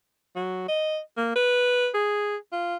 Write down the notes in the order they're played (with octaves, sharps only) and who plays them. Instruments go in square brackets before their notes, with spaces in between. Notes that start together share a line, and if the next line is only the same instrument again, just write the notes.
[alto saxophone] F#3
D#5
A#3
B4
G#4
F4